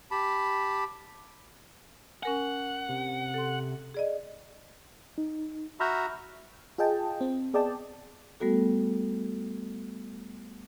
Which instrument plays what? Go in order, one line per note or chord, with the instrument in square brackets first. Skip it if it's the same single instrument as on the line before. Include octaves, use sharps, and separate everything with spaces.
[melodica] G4 A5 B5
[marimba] C#4 A#4 G#5 [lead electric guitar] F#5
[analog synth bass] C3
[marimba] A4 C6
G#4 D5 D#5
[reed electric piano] D#4
[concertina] F#4 E5 A#5 [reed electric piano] B5 F6 G6
[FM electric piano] F4 G#4 D#5 G5 A5
C4
B3 G#4 D5 D#5 G5 A5
[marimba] G3 A3 B3 F#4 A4